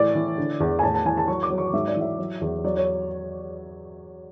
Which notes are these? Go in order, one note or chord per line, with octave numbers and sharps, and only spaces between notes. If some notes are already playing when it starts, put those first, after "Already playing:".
Already playing: A2 E3 D5
E3
D3
E2
G#5
A2 A5
A5
E3 G#5
A5
F#3 C#6
D6
F#3
C#6
G#2 E5
D5
E3 E5
F#3
E2
F#3 D5
C#5